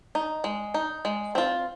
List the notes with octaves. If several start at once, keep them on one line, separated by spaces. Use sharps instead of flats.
D#4
G#3
D#4
G#3
C4 F4